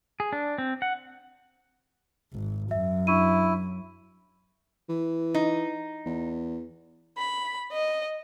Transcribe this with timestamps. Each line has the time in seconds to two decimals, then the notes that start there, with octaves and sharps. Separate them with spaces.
0.20 G#4
0.33 D4
0.58 C4
0.82 F#5
2.33 G#1
2.71 F#2 E5
3.07 D4 E4 C#6 D#7
4.89 E3
5.34 D#4
6.06 E2
7.18 B5
7.72 D#5